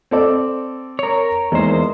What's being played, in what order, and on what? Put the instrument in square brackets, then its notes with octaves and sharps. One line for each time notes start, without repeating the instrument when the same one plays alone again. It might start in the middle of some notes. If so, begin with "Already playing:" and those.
[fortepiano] C4 A4 D5
[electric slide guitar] A#4 C#5
[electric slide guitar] E2 C5 [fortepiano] G#3 A#3 D#4